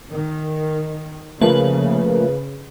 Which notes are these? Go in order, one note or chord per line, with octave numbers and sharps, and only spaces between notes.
D#3
C#3 F3 A3 A#3 B4